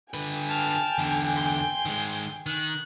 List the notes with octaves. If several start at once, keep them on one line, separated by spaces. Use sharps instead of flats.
D3 B4 G5 G#5
A5 F6
E2 D3
C6
D#3 G#3
D#3 F#6